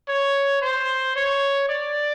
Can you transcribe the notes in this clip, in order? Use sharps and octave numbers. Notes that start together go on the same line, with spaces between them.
C#5
C5
C#5
D5